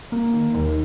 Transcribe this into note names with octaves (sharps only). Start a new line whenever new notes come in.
A#3
D#3
D#2